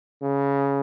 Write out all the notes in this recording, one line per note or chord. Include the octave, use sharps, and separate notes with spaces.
C#3